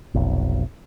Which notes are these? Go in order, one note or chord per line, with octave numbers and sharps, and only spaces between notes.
F1 B1